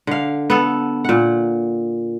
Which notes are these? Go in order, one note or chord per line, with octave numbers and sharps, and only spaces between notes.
D3 F5
B3 A4
A#2 F#5